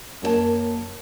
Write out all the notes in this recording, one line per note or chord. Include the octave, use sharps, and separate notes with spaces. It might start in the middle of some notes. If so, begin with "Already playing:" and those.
F#2 A#3 F#4 C#5 A5